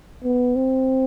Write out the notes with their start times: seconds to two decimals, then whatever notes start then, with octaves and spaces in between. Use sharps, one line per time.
0.24 B3
0.56 C4